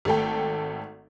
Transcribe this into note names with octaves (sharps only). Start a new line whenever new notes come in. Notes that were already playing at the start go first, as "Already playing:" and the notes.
G#1 A3 A4 G5